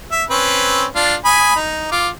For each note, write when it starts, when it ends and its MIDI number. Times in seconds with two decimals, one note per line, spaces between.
0.11 0.24 76
0.30 0.85 60
0.30 0.85 61
0.30 0.85 71
0.95 1.14 62
0.95 1.14 65
1.25 1.55 80
1.25 1.55 83
1.25 1.55 87
1.55 1.89 63
1.92 2.08 65
1.92 2.08 86